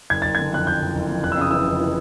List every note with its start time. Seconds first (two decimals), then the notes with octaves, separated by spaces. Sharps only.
0.10 F#1 G#6
0.22 F#1 A6
0.35 D3 G#6
0.53 F2 F#6
0.67 F#1 G6
0.81 F#1
0.95 F#1
1.09 F2
1.23 F1 F#6
1.32 E6
1.37 C#3 D#6
1.51 E3 E6
1.66 F1
1.80 E3